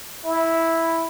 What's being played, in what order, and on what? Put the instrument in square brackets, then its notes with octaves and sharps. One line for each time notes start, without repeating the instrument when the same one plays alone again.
[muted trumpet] E4